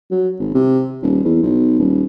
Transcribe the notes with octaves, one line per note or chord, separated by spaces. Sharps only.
F#3
G#1
C3
D#1
E2
B1
D#1